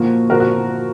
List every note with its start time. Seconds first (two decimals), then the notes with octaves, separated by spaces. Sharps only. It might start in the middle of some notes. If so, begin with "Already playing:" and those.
Already playing: A#2 F3 A#3 F#4
0.30 A#2 F3 A#3 F#4 A#4
0.40 F#4